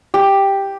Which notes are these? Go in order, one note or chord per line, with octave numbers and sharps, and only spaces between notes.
G4